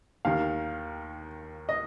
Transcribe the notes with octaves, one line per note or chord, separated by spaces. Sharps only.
D#2 D#3 F5
D#5